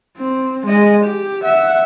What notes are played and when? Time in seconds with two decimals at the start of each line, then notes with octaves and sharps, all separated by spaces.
0.17 C4
0.66 G#3 D#5
1.04 G4
1.43 E5 F#5